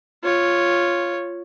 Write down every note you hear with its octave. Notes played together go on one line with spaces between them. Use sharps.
F4 C#5